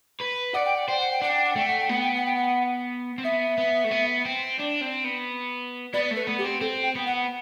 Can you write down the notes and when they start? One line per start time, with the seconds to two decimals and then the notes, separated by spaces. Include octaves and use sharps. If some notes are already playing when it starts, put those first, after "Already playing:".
0.21 B4
0.54 D5 F#5
0.66 G5
0.77 F#5
0.88 C5 G5
1.00 F#5
1.11 G5
1.21 D4 F#5
1.35 G5
1.46 F#5
1.56 A3 G5
1.68 F#5
1.80 G5
1.89 B3 F#5
2.03 G5
2.15 F#5
2.26 G5
2.37 F#5
3.18 C4
3.24 B3 E5
3.58 B3
3.84 A3
3.91 B3
4.25 C4
4.60 D4
4.81 C4
5.04 B3
5.94 B3 D5
6.11 A3
6.16 B4
6.27 B3
6.39 G4
6.44 C4
6.61 C4 A4
6.84 G5
6.95 B3
7.07 F#5